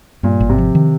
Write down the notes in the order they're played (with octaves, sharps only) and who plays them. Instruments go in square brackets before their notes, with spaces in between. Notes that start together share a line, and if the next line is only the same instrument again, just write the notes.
[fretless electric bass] G2 [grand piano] A#2
[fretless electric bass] G#1
[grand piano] C3
[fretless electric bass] F3
D#3